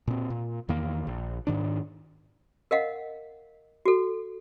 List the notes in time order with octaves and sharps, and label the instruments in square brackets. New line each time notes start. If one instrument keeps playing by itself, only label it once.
[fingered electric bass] A#2 C4
A#2
E2 D#3 A#3
A#1
G#2 D#3 D4
[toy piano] A#4 D#5 F5 F#5
F#4 A4